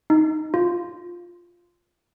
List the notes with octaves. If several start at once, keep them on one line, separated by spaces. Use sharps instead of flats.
D#4
F4